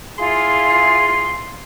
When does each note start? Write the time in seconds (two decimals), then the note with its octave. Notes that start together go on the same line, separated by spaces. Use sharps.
0.18 E4 F4 G#4 F5 C6